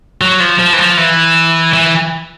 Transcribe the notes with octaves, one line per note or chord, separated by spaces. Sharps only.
F#3
F3
F3
E3
F3
E3
E3